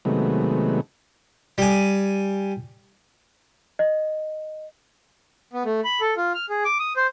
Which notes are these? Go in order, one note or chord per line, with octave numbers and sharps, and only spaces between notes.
C3 D#3 F#3 G#3 A3 B3
G3 G#5
D#5
B3
A3
B5
A4
F4
F6
G#4
D6
D#6
C5